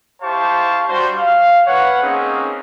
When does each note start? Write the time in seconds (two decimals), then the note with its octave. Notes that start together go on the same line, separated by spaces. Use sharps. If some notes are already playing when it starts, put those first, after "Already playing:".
0.22 E4 G4 C5 F5 A5 C#6
0.88 G3 D4 F#4 C5
1.17 F5
1.67 B4 C#5 F#5
2.02 A#3 C4 C#4 D#4 G#4